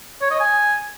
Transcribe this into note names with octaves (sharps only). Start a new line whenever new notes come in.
C#5
D#5
G#5